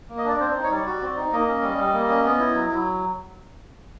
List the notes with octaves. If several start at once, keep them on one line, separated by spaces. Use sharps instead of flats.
A#3
D#5
D4 D5
C4 C5
C5
D#4
C#5
G3 D5
F#4
C4
D#4
A#3 D#5
C#4
G3
G3
A#3
C#4
B3
E4
F#3
F#3